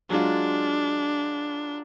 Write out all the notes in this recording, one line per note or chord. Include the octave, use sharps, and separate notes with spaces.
F#3 G#3 D4 F4